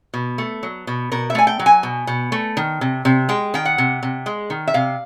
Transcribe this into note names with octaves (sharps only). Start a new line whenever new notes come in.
B2
A3
F#3
B2
B2 A#4
E5
A3 G#5
G5
F#3
G#5
B2
B2
A3
D#3
C3
C3
G#3 G5
D#3 G5
F#5
C3
C3
G#3
D#3
E5
C3 F5